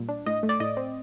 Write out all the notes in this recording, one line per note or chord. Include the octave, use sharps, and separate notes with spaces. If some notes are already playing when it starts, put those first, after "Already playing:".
Already playing: A#2 G3
D4
A2 D#5
A3
D5
A2 D#5
C4